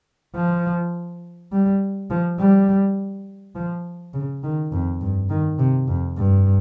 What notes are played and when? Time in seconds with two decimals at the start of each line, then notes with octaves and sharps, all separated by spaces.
0.35 F3
1.52 G3
2.10 F3
2.39 G3
3.55 F3
4.14 C#3
4.43 D#3
4.72 F2
5.01 G2
5.30 D#3
5.59 C3
5.88 F2
6.17 G2